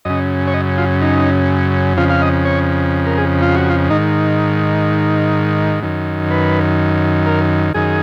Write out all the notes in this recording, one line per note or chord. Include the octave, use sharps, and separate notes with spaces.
F#2 C#3 D#5
C#5
D#5
F4
D#4
F2 C#3 F4
F5
D#5
C#5
A#4
G#4
F4
F#4
F4
G#2 D#3 D#4
F#2 D#3
B4
A#4
F#2 D#3 G#4